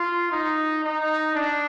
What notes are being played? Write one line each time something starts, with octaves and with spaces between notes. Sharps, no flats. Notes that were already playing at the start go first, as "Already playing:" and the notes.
Already playing: F4
D#4
D#4
D4